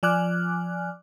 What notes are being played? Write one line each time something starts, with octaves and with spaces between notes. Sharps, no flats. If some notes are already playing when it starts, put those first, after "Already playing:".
F3 D5 G#5 D6 F6 F#6